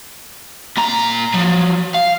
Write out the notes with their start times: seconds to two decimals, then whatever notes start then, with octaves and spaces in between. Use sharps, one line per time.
0.77 A#2 A#5
1.34 F3 F#3
1.94 F5